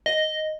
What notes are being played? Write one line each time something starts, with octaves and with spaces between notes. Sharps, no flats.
D#5